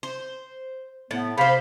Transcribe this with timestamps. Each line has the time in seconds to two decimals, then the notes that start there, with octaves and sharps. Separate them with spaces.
0.03 C5
1.11 A2 B3
1.38 C3 C5 F5 B5